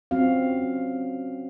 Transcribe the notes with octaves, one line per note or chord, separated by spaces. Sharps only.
F#3 C4 C#4 F#4 F5